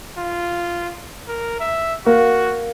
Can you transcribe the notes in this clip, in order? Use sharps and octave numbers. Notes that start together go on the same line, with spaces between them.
F4
A#4
E5
A#3 F#4